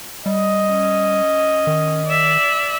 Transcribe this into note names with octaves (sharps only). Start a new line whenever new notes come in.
G3 D#5
C#4
D#3
D5 E5